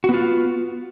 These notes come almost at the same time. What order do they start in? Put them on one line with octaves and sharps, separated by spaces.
F#4 B3 F4